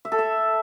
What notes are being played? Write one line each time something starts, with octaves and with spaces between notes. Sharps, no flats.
E5
A4
E5